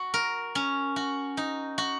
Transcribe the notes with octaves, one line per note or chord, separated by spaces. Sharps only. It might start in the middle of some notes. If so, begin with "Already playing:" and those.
Already playing: F#4
A#4
C#4
F#4
D#4
F#4